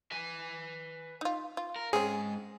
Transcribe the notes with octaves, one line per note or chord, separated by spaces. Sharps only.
B4 G#5
D#4 F4
F4
A#4
G#2 C4 C#4 G#4